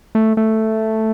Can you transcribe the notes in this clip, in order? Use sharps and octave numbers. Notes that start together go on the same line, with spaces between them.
A3
A3